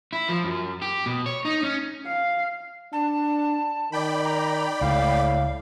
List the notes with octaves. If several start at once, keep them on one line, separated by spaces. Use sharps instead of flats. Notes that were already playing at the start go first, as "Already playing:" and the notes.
E4
F3
F#2
G4
B2
C#5
D#4
C#4
F5
D4 A5
D#3 D5 G5 B5
A#5
C#2 A2 F5